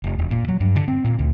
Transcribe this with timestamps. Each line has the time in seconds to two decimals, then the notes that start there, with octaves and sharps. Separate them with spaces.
0.04 F1
0.19 E1
0.31 A#2
0.48 F#3
0.60 G2
0.76 D3
0.88 C4
1.04 A#2
1.19 D2